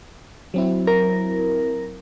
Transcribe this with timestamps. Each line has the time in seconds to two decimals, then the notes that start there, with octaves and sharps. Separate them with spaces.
0.54 F#3 C4 E4
0.87 A#4